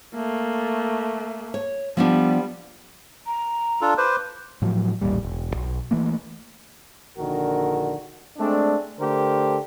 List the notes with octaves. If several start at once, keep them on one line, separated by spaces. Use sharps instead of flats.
A3 A#3
C#5
F3 G3 B3 D4
A#5
D4 F4 A4
B4 C5 D6
A2 F3 F#3
A1 D#2 A#2 G3
E1
B1
E3 A3 A#3
A#1 D3 D#3 F#4 A#4
G#3 A3 C4 D4
D3 A3 G4 A#4 C5